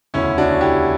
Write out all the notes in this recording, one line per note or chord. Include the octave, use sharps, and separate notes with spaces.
E1 D2 C#3 C#4 E4
D4 F#4
E4 G4